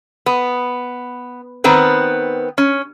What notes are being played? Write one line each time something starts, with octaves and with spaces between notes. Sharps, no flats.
B3
D#3 B3 C4 B4
C#4